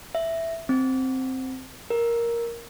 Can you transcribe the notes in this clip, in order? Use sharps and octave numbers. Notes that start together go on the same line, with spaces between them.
E5
C4
A#4